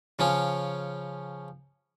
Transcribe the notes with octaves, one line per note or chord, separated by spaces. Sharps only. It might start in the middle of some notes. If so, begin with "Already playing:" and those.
C#3 F3 C#4